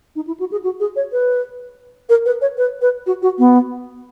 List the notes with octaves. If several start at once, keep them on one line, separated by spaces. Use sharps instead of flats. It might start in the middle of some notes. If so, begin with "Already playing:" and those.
D#4
E4
F#4
G#4
F#4
G#4
C#5
B4
A#4
B4
C#5
B4
B4
F#4
F#4
B3